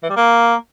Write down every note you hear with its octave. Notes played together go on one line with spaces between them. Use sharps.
E3
G3
A#3